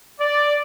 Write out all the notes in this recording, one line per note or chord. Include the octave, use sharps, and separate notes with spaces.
D5